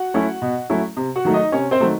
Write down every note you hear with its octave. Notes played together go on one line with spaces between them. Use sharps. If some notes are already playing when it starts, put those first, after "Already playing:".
Already playing: F#4 F#5
F#3 A3 C#4 E4
B2
F#3 A3 C#4 E4
C3
F#4 F#5
D#3 F#3 A3
D#4 D#5
C3 C#4 C#5
C4 C5
D#3 F#3 A3